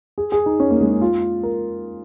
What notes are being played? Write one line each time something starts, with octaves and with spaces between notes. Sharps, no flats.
G#4
G#4
D#4
C#4
A#3
G#3
C#4
F4
A#4